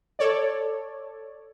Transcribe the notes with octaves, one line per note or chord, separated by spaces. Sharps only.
A4 C#5 D5